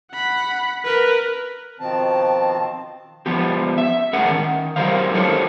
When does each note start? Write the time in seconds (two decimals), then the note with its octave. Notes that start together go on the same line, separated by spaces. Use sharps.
0.11 F#5 B5
0.84 A#4 B4
1.80 B2 D#3 F3 C4 A5
3.26 F3 B3 G4
3.78 E5
4.13 A2 C#4 G#4 A#4 F#5
4.30 D#3
4.76 F#3 G4 A#4 C5 F5
5.14 E4 G4 A4 A#4 C5 C#5